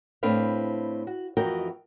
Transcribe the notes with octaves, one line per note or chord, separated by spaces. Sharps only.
A2 C4 D4 B4 F5
F#4
F2 E3 F#4 A#4 D#5 G5